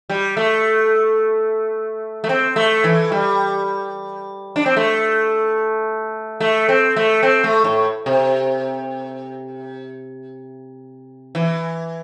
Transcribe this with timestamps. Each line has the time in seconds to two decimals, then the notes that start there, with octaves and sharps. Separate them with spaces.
0.09 G3
0.37 A3
2.24 A3
2.29 C4
2.56 A3
2.84 E3
3.12 G3
4.56 D4
4.66 C4
4.77 A3
6.40 A3
6.69 C4
6.96 A3
7.23 C4
7.44 A3
7.64 A2
8.06 C3
11.35 E3